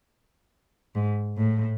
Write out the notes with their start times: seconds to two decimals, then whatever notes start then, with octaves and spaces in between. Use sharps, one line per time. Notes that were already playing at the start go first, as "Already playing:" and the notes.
0.94 G#2
1.36 A2